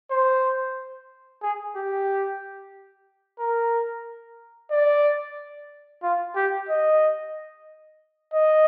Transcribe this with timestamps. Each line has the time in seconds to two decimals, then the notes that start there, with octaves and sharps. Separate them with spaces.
0.11 C5
1.42 G#4
1.76 G4
3.39 A#4
4.71 D5
6.02 F4
6.36 G4
6.69 D#5
8.33 D#5